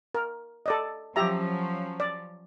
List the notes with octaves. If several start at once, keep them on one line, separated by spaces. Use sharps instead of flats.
A#4
A4 D5 D#5
F3 F#3 C#4 G4 E5 A#5
D5